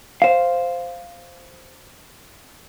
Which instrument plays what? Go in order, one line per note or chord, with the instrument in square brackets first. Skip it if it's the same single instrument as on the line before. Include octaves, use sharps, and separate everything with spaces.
[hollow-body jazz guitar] C5 F5